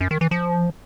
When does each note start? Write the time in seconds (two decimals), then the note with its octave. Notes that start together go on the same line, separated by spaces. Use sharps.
0.01 F#2
0.11 D#3
0.21 E3
0.31 F3